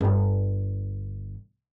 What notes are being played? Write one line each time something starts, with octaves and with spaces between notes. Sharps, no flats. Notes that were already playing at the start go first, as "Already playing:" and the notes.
G1 D3